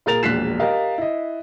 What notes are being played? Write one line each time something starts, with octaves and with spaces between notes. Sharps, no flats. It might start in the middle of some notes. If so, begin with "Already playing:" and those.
A#2 G#4 A#4 A6 F7
E1 A#1 F#6 B6 C7 E7
G4 A#4 D#5 F5
E4 D#5